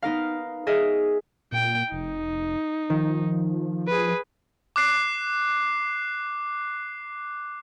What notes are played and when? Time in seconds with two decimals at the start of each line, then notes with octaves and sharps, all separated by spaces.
0.02 B3 D#4 A#4 F5
0.67 G#4 A#4 D#5 E5
1.52 A#2 G5
1.92 F1 D#4
2.90 D#3 F3
3.87 G#4 B4
4.76 D6 F#6 C7